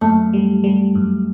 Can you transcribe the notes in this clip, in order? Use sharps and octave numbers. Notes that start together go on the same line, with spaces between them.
F#2 A3
G3
G3
F#2